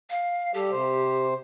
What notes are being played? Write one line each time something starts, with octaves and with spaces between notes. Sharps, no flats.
F5
G3 G4 A4
C3 C5